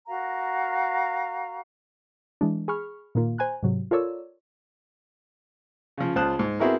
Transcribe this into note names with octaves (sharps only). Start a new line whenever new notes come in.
F#4 A#4 F5 A#5
E3 G#3 D4
G#4 B5 C#6 F6
A#2 D#3 A#3 F4
C5 G#5 A#5 F#6
G#2 C3 F#3
F4 A4 A#4 C#5 D5 E6
C#3 F3
C#2 F4 C5 A5 D#6 F#6
G#2
B3 C4 E4 F#4 G#4 A#4